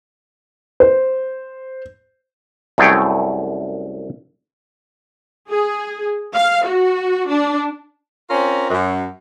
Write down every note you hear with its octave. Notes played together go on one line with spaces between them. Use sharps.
C5
C2 F#2 A3 G#4 C#5 G5
G#4
F5
F#4
D4
C4 C#4 F4 A#4
F#2